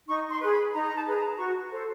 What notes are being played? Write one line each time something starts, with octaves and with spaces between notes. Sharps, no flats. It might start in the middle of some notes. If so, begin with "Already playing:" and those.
D#4 C#6
C6
G#4 B4
B5
D#4 A#5
A#5
A5
G#4 B4
A#5
F#4 C#6
A4 C5